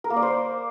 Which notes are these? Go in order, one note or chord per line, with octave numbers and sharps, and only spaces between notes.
A#4
A#3
D5
C5